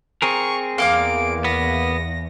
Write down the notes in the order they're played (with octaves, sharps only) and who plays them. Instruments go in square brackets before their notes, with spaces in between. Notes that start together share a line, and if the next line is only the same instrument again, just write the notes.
[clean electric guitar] C4 G#4 A#4 [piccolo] C#6
[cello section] E2 [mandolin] A#3 F5 D6 [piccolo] D7
[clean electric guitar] B3 [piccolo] A#6